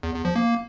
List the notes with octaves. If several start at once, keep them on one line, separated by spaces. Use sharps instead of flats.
E2
E2
F3
A#3